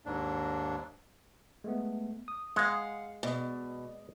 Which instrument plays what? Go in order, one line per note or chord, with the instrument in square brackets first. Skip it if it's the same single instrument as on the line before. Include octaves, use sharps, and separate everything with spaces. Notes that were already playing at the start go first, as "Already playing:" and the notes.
[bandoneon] D#2 G#2 D4
[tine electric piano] G#3 A3 B3
D#6
[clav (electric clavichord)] G#3 [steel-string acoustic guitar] F5 F#5
[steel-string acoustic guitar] B2 [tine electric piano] D5 D#5